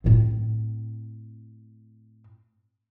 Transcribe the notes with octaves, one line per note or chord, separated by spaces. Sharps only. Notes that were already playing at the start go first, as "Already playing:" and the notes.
A2 C4